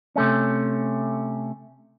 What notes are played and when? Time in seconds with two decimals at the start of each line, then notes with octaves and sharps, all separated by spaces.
0.16 C3 A3 C#4